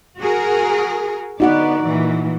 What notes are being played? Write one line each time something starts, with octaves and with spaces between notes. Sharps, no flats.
F#4 G#4 A#4
D3 B3 D#4 F#4 D5 F#5
A#2 E3